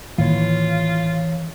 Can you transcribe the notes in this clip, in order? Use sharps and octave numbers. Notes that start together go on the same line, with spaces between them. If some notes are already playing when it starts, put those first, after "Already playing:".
A2 D#3 E3 A#3 F4 C#5